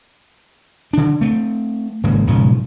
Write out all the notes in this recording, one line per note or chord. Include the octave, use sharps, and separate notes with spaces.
D3 D4
A3 C4
G#1 G#2 C#3 A#3
B1 G#2 C#3 F3